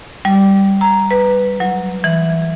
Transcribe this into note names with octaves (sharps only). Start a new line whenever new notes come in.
G3
A#5
B4
F#3
E3